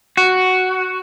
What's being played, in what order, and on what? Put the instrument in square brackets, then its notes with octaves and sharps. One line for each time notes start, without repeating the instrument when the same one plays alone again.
[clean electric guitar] F#4